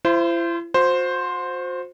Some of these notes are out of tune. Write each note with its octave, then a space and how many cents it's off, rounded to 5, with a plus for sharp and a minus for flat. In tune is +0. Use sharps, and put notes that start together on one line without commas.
E4 +45 C5 -10
F#4 -40 C5 +0